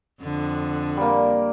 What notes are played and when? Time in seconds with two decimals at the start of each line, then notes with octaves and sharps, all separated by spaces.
0.23 F2 D3
0.97 G3 A#3